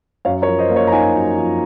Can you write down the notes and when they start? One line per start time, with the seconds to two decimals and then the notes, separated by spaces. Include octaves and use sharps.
0.25 F#2 C#5 F5
0.42 A#4 C#5
0.48 F3
0.59 C5 D#5
0.70 A#3
0.76 C#5 F5
0.87 A#5
0.92 D#4 F5 G#5
1.14 F#2
1.37 F3